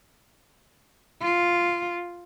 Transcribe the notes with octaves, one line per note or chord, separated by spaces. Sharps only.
F4